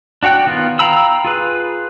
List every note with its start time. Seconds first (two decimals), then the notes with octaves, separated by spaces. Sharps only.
0.23 D4 F#4 C#5 G5 F#6
0.46 D#3 B3 F4
0.79 F5 G5 A#5 B5 E6
1.25 F4 G#4 B4